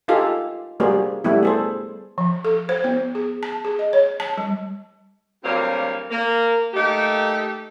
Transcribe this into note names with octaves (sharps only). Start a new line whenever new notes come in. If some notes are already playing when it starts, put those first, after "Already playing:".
D#4 F4 G4 A4 F5 G#5
G3 A#3 F#4 G#4 C5 D5
G3 A3 B3 E4
G#4 A4 C5
F3
A4
C5
B3
G#4
A5
G#4
D#5
C#5
A5
G3
D2 F#3 G3 A#3 C4 F5
A#3
A3 A#3 D#4 G4